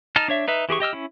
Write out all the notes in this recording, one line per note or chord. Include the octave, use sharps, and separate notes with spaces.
D#4 A5 F6
D4 C#5 E5
D#4 B4 E5
E3 G4 G#4 C#6
G4 D#5 E6 F6
C#4 E4